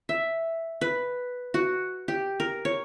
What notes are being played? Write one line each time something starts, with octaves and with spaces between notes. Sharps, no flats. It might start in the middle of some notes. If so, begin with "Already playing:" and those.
E5
B4
F#4
G4
A#4
C#5